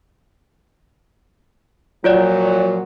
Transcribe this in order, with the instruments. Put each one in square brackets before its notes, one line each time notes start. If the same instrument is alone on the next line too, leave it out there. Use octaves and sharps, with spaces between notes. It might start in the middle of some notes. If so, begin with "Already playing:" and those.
[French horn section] A#2 F3 F#3 [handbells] F4 C#5 D5